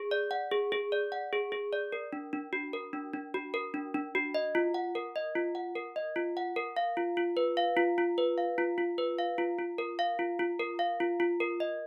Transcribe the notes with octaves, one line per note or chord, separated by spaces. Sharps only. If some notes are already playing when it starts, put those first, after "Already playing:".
Already playing: G#4
D5
F#5
G#4
G#4
D5
F#5
G#4
G#4
D5
A#4
D4
D4
F#4
A#4
D4
D4
F#4
A#4
D4
D4
F#4
D#5
F4
F#5
A#4
D#5
F4
F#5
A#4
D#5
F4
F#5
A#4
F5
F4
F4
B4
F5
F4
F4
B4
F5
F4
F4
B4
F5
F4
F4
A#4
F5
F4
F4
A#4
F5
F4
F4
A#4
D#5